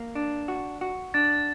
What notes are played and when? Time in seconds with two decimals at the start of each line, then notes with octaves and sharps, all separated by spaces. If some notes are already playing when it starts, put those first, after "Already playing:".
Already playing: A#3
0.15 D4
0.48 F#4
0.81 F#4
1.14 D4 A6